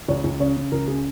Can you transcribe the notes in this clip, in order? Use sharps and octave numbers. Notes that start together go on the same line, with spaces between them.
C#2 C#5
C#2
C#3 C#5
C#3
C#2 A#4
C#3 G#4